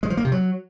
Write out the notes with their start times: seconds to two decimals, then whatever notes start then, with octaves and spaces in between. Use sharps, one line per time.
0.03 G#3
0.10 F3
0.17 A#3
0.25 C3
0.32 F#3